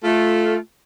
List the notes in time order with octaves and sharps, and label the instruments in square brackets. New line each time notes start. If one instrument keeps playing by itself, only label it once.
[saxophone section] A3 F4